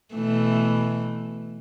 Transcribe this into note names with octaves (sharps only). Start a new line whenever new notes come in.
B2 E3 A3